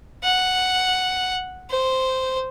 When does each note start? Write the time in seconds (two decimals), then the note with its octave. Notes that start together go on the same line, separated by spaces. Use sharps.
0.24 F#5
1.70 C5